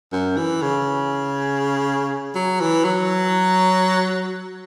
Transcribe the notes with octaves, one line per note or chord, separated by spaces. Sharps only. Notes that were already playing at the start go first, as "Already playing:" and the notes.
F#2
E3
C#3
F#3
E3
F#3